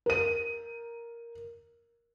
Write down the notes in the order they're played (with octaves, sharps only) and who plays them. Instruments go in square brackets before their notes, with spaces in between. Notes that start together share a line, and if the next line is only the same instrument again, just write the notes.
[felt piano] A#4 D#7